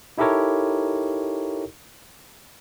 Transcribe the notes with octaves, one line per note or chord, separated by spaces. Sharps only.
D#4 E4 G4 A4 A#4 C#5